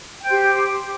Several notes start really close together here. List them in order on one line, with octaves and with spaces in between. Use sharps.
G5 C5 G4